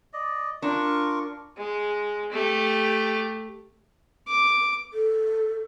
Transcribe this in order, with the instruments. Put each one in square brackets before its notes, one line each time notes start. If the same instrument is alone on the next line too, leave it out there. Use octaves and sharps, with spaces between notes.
[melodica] D5 D#5
[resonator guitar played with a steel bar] D4 [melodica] F4 A#4 C#6
[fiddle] G#3
A3 G4
[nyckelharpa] D6
[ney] A4